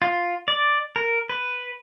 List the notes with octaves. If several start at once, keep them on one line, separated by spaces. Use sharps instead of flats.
F4
D5
A#4
B4